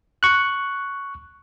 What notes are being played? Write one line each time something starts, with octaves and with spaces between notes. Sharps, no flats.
C#6 F#6